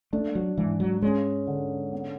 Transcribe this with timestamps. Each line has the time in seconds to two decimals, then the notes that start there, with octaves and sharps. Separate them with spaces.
0.13 A3 D4
0.35 F#3
0.58 G#2 E3
0.80 F#3
1.02 G#3 C#4
1.47 D3
1.93 B3